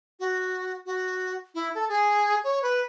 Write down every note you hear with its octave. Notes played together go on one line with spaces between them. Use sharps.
F#4
F#4
E4
A4
G#4
C#5
B4